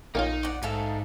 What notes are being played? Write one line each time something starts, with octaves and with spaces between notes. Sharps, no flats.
A#1 A#3 C#4 D#4 F4
D5 F#5 C#6
G#2 A4 E5 F5